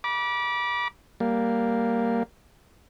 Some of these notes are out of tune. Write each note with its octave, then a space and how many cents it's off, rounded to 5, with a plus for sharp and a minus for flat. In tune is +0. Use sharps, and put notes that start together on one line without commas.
B5 -35 D6 -5
G3 +0 A#3 +0